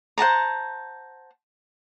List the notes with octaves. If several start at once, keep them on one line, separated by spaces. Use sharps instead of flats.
C5 F#5 A5 A#5